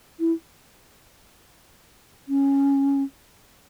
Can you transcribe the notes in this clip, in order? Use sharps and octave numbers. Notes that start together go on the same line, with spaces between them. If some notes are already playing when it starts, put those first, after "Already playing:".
E4
C#4